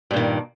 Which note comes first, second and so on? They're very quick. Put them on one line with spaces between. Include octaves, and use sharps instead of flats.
G2 A#2 D#3